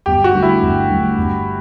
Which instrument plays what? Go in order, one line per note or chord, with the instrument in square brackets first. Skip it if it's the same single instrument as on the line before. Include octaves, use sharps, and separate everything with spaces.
[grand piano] G1 [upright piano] G4
[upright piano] F#4
[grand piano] G2 D3 A3
[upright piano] E4
[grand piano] G1
G2 D3 A3
G1